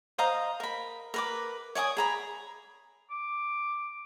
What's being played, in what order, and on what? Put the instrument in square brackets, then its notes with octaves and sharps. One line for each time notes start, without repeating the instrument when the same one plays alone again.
[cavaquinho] C5 D#5 F5 A#5
A#4 B5
A#4 B4 D6
C#5 D5 G#5 D#6
G#4 A#5 B5
[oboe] D6